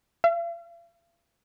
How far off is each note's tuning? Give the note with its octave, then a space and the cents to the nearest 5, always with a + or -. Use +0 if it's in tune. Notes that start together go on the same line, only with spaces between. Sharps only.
F5 -45